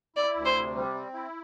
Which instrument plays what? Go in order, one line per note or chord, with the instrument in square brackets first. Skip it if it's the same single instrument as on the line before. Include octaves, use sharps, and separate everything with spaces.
[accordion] E4 [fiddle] D5
[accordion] D2
[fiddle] C5
[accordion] C3
G3
C4
E4